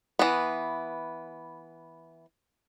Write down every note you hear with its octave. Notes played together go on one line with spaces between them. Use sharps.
E3 B3